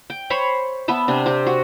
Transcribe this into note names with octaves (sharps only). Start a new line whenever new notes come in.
G5
C5 C#5 B5 C#6
B3 B4 E5 A5
C3 D4
C4 G4
F#4